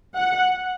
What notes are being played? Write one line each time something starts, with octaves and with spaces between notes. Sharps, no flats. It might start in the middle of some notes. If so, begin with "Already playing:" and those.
F#5